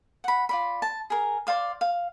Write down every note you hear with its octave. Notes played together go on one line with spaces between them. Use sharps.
F#5 B5
F4 D5 B5
A5
G#4 A#4
C5 D5 F5 D6
F5